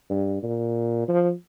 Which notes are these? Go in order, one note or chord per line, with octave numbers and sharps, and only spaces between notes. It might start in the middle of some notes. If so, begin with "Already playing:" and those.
G2
A#2
F3